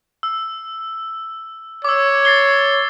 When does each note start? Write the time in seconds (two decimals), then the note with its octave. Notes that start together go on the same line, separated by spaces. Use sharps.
0.23 E6
1.84 C#5 D6 E6
2.25 A6 C7 G7